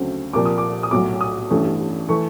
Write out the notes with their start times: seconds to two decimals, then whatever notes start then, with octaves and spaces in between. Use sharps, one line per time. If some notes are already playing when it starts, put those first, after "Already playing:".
Already playing: D2 C#3 F#3 A3 C4
0.33 C2 A#2 F3 A#3 D6
0.45 D#6
0.58 D6
0.83 D#6
0.91 B1 A2 F#3 D6
1.21 D#6
1.50 A1 G2 E3 A3 C#4
2.09 E3 A3 C#6